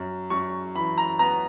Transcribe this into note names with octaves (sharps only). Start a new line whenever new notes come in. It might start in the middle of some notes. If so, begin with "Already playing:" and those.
Already playing: F#2
F#2 C#6
E3 B5
A#5
B3 A#5